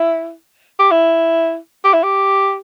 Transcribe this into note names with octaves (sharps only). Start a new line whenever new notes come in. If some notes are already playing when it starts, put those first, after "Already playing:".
Already playing: E4
G4
E4
G4
E4
G4